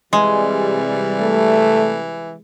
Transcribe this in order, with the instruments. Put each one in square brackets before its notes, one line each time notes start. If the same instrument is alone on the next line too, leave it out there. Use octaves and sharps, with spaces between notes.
[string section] C3 G3 [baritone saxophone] E3 [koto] G#3
[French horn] A3